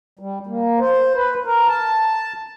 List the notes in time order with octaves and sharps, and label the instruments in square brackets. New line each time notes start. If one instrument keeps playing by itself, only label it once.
[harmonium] G3
A#3
C5
B4
A#4
A5